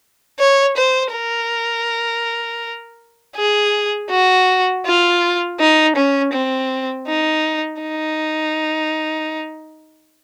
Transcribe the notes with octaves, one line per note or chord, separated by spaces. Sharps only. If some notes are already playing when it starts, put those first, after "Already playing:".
C#5
C5
A#4
G#4
F#4
F4
D#4
C#4
C4
D#4
D#4